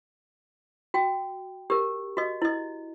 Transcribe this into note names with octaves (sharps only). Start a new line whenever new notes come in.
F#4 G5
G4 A#4
F#4 D#5
E4 D#5